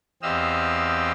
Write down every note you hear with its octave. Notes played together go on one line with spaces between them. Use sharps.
E2 C4 G4 D#5 F5 E6